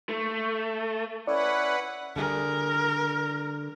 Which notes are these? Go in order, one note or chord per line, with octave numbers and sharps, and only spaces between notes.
A3
C#4 E4 B4 D5 F#5
D3 G3 G#4 A#4